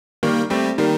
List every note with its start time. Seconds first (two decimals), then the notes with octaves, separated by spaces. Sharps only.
0.23 D#3 G3 A#3
0.50 G3 A3 C4
0.78 D#3 G3 A#3